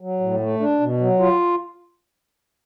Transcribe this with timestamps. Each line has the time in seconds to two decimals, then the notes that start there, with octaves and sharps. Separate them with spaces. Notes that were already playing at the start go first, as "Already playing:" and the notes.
0.01 F#3
0.20 A2
0.40 A3
0.60 D4
0.80 B2
1.00 F#3
1.20 F4